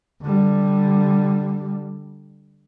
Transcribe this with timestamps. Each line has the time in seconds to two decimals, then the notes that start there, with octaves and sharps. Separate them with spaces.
0.22 D3 G3